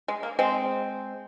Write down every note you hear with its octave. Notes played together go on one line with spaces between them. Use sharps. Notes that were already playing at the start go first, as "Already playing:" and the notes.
G#3
A#3
G#3 C4